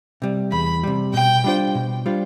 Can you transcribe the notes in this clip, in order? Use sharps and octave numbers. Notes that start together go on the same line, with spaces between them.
C3 G3
E2 B5
C3 G3
B2 G5
G3 D4 F4 C5
B2
G3 D4 F4 C5